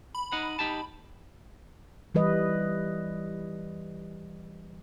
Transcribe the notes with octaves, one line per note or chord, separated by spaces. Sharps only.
B5
D#4 D#5 F#5
D#4 G4 A5
E3 G3 B4 D#5